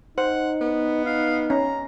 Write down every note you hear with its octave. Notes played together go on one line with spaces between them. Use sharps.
D#4 C5 F#5
B3
D#4 F5
C#4 A#5